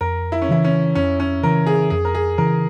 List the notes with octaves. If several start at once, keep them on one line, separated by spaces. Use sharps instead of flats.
F2 A#4
E4
C#4
C#3 E3 E4
C#4
F2 C#4
C#4
C#3 E3 A#4
G#4
F2 G#4
A#4
G#4
C#3 E3 A#4